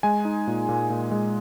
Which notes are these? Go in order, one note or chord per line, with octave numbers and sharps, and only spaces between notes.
G#3 G#5
D#4
A#2
A#2
A#2
G#3